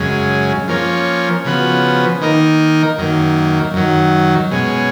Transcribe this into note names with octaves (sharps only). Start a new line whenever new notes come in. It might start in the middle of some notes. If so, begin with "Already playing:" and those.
Already playing: F#2 C#3 G#3
F3 A#3 C#4
C#3 F3 B3 F#4
D#3 A#3 D#4 A#4
F#2 D#3 A#3
F#2 D#3 F#3
B2 G#3 C#4